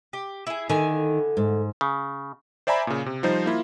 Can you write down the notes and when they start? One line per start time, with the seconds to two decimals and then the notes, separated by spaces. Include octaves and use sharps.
0.13 G4
0.47 E4 G#4
0.69 D3 D#3 E4 G#5
1.37 G#2
1.81 C#3
2.67 C5 D5 E5 G#5 A#5 B5
2.87 A#2 C#3
3.06 C3
3.23 F3 G3 D#4 C5
3.46 A#3 E4 F4